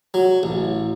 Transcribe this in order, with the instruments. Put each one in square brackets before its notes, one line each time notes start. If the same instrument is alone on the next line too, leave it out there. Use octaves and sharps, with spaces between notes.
[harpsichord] F#3
A1